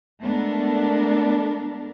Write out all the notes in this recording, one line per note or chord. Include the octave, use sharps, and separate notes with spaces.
G#3 A3 B3 D4 A4 A#4